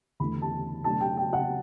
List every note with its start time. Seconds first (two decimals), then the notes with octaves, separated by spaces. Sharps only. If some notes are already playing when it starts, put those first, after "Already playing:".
0.20 E2 D3 A3 B5
0.42 A5
0.84 B2 F#3 A3 D4 A5
1.00 G5
1.17 G5
1.33 F#5